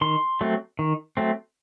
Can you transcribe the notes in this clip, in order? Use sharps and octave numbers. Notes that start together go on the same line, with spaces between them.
D#3 C6
F#3 A3 C4
D#3
F#3 A3 C4